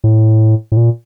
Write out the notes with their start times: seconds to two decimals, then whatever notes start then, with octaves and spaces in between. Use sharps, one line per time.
0.04 A2
0.72 A2
0.77 A#2